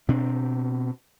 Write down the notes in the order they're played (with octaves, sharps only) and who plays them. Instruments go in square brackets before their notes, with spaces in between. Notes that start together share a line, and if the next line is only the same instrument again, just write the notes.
[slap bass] B2 C4 D4